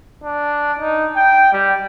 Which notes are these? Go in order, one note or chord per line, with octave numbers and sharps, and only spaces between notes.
D4
D#4
G5
G3